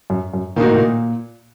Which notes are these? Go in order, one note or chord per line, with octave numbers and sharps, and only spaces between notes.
F#2
F#2
A#2 D#3 A#3 D#4 F#4
A2
A#2